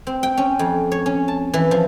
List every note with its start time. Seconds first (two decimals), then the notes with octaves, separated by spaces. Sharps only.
0.07 C4
0.23 G5
0.37 C#4
0.59 F2
0.92 C#5
1.06 C#4
1.28 A5
1.54 E3
1.71 F3